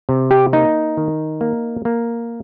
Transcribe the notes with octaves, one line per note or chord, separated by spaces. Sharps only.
C3
G4
A#3 D#4
D#3
A#3
A#3